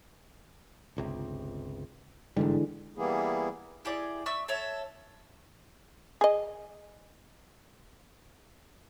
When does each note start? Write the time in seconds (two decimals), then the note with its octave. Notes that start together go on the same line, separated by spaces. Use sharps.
0.97 G1 C#2 C3
2.37 G1 G#2 D3 E3 G3 G#3
2.97 E3 G3 A#3 B3 E4 G#4
3.85 E4 G4 G#4 D5
4.26 D5 E5 C#6 E6
4.48 A4 C#5 E5
6.21 G#4 D#5